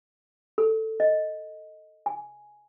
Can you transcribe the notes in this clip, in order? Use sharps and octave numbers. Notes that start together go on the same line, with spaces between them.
A4
D#5
G#5